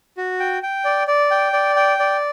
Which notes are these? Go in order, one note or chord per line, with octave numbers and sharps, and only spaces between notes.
F#4
G5
G5
D5
D5
G5
D5
G5
D5